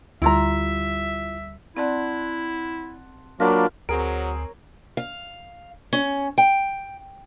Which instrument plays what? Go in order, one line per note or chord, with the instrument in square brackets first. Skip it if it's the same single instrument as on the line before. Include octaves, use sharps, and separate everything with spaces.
[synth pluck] D2 G3 [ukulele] E4 F4 A#5 [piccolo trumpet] E5
[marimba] C4 D5 [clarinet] E4 [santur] F#5 A5 C6
[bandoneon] F#3 A#3 D4 [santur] F4 B4 A5 [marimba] A#4
[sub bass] D2 [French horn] F#3 [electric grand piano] C4 G#4 D7 [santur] A#4 C#5
[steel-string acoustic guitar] F5
C#4
G5